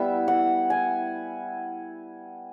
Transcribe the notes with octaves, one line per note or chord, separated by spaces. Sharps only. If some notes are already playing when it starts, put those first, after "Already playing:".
Already playing: G3 B3 E4 E5
F#5
G#5